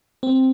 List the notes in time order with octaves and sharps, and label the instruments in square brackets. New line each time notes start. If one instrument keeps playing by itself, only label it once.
[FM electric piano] C4